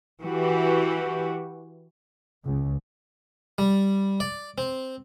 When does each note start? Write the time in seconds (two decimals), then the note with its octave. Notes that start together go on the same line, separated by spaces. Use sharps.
0.22 E3 F#4 G4
2.45 C#2
3.58 G3
4.20 D5
4.58 C4